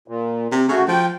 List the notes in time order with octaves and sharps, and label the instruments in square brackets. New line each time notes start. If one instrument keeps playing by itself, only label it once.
[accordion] A#2
[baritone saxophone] C3
[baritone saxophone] C#3 [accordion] A3 F#4
[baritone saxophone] F3 [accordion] G5